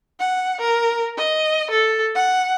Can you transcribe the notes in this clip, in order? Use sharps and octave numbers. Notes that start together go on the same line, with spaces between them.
F#5
A#4
D#5
A4
F#5